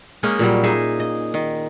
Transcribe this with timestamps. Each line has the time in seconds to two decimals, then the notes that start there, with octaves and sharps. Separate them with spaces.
0.23 G#3 A#3 C#4 D#4
0.39 A#2 F#3 G3
0.63 D#4 G#4 E5
1.00 D#5
1.34 D#3